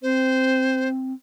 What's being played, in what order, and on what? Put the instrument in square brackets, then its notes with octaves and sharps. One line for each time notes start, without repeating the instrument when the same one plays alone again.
[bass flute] C4 [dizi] C5